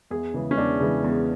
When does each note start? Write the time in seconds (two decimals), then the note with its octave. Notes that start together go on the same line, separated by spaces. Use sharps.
0.11 E2 G#4
0.34 C#3 E3
0.51 C#4
0.57 E2 D4
0.80 C#3 E3
1.04 E2